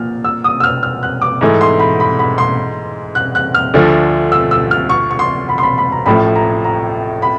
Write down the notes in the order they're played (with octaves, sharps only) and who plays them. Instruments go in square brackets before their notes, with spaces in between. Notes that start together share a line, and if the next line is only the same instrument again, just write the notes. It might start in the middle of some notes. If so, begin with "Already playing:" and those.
Already playing: [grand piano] A#2 F3 [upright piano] F6
[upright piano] E6
D#6
E6
F6
F6
F#6
D6
[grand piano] G#2 E3 A3
[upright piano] C6
B5
B5
B5
C6
F#6
F#6
F6
[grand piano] D2 D3 F3 A3
[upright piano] E6
E6
F6
C#6
C#6
C6
B5
C6
B5
B5
A#5
[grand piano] A1 A2 F3 A3 [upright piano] B5
[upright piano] A#5
A#5
B5